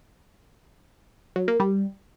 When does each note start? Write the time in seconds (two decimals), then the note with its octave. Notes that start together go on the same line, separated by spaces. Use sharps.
1.36 F#3
1.48 A#3
1.60 G3